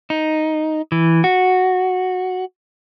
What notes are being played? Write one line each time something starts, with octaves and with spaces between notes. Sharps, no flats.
D#4
E3
F#4